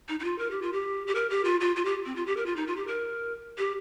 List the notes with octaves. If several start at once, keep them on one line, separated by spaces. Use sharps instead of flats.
D#4
D#4
F4
A#4
G4
F4
G4
G4
A#4
G4
F4
F4
F4
G4
C4
F4
G4
A#4
F4
D#4
F4
G4
A#4
G4